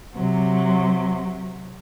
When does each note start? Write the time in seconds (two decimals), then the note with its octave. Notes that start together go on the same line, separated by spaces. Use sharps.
0.15 C3 F#3